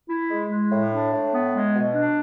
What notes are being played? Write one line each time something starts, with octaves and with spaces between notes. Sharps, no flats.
E4
G#3
G#3
A2
D4
A2
B3
G#3
B2
D4